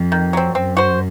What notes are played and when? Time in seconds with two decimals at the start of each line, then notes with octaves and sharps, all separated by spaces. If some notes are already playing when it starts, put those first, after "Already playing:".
Already playing: F2
0.12 D#3
0.33 F#3 C4
0.55 F#2 C4
0.77 F#4 C5